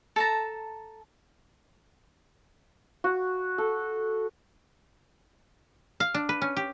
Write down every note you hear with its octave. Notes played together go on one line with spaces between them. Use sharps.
A4 A5 A#5
F#4
A4
F5
D4
B4
C#4
G4